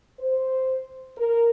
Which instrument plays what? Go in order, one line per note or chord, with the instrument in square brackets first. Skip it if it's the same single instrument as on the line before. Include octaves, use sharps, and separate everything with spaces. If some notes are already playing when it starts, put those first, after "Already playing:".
[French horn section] C5
A#4